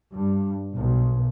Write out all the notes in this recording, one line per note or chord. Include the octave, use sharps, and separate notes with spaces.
G2
B1